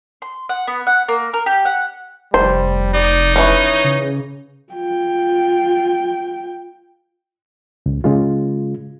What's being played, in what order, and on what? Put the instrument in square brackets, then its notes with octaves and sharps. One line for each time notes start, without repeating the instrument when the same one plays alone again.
[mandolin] C6
F#5
B3
F#5
A#3
A#4
G4
F#5
[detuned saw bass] F1 [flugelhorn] G3 [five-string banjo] C5
[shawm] D#4 [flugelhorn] D5
[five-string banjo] E3 C#4 [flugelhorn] C#5
[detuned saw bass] C#3
[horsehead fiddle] F4 G5
[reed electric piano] C#2
C#3 G#3 F4